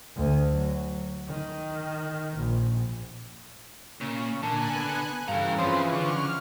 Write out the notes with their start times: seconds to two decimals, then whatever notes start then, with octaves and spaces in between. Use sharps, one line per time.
0.16 D2
0.52 F#3
1.28 D#3
2.37 A#1
4.01 A#2 C#3
4.43 A#2 D3 G#5 A5 F#6
4.75 B3
5.28 G2 C#3 E3 A4 F5 A#5
5.58 F3 C4 F4 B4 C5
5.93 D3 C#6 F6